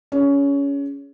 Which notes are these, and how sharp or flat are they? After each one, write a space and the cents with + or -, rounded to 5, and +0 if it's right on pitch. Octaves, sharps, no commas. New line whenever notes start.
C#4 +20 G#4 +0